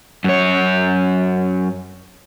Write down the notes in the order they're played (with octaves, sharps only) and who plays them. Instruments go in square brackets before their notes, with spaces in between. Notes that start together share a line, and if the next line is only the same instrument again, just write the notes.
[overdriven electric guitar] F#2 C#5